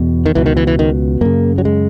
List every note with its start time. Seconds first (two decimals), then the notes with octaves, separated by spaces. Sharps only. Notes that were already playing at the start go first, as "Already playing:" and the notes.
Already playing: E2 B2
0.26 D#3
0.35 C#2 B2 E3
0.46 D#3
0.57 E3
0.67 E3
0.79 D#3
1.21 F#2 C#3 A#3
1.58 F#3
1.65 G#3